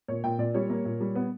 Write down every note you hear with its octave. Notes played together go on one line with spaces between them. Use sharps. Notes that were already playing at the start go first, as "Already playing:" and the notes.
A#2 C#5
A#2 G5
A#2 D5
G3 C#5
A#3
A#2
G3
B3